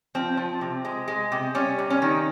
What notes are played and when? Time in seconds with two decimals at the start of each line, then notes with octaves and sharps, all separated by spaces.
0.15 F3 C4
0.37 F3
0.61 C3
0.85 G#3
1.08 G#3
1.32 C3
1.55 G3 C#4
1.79 C3
1.90 C#4
2.02 D#3